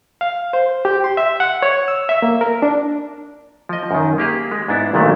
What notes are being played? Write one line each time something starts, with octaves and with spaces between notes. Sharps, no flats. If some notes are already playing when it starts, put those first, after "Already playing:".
F5
C5
G4
C6
E5
F#5
C#5
E6
E5
A#3
A#4
D4
F3 D#5
F#2 D#3
A#3 G4 G#4
G#3
G#2 B3 D4 E4
A#1 A#2 D#3 F#3 A3